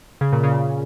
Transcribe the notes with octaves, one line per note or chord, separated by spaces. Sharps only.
C#3
A#2
C#3